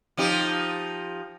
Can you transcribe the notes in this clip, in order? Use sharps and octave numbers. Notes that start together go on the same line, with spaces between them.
F3 D#4 G4